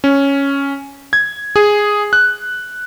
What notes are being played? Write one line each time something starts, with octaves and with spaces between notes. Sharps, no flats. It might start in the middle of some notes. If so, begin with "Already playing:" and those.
C#4
G#6
G#4
F#6